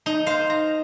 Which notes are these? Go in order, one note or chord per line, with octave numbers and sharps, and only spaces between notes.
D#4
C5 F5
A#5